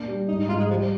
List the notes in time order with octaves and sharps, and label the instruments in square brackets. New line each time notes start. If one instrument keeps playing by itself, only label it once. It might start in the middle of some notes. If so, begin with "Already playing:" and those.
Already playing: [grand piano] A#2 D4
G3
[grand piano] G#2 [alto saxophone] D#4
[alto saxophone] D#4
[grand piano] G#2 [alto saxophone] F4
[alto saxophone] G#3
[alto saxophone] F3 [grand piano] G3